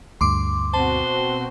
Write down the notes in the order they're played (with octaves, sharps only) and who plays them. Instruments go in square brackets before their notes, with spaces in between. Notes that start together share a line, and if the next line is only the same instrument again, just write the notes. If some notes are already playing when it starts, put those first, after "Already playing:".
[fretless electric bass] D2 G2 [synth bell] C6 D6
[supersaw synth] B2 C4 F#4 [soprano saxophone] C5 [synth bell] A5